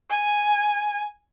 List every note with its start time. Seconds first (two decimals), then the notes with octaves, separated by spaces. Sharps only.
0.10 G#5